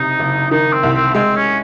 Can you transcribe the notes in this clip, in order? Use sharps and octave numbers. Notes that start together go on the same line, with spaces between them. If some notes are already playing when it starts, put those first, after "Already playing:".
Already playing: F#1 C3 D#4
F#1
D#3 D#4
C4
C2
C4
G#3 C4
C#4